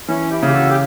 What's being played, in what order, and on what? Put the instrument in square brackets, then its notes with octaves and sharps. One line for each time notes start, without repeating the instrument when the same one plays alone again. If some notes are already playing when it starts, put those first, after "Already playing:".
[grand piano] E3 [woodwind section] C#4
[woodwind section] E4 G4
[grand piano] C#3 [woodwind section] G4
[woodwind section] F#4 A4
G4